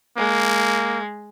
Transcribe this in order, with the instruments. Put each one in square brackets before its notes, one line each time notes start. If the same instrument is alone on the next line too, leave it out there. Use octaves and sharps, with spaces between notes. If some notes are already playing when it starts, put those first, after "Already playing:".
[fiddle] G#3 [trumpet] A#3